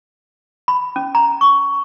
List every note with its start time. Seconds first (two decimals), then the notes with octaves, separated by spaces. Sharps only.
0.68 B5
0.96 C#4
1.15 A#5
1.41 C#6